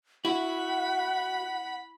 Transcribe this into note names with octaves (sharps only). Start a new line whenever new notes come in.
E4 F#4 F#5 B5